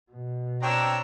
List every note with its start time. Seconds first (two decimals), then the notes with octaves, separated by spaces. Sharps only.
0.11 B2
0.63 C4 D4 C#5 G5 A#5 E6